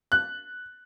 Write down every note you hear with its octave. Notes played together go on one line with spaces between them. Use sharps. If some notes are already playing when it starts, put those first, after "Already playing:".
F#6